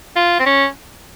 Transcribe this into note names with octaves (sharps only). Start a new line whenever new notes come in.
F4
C4
C#4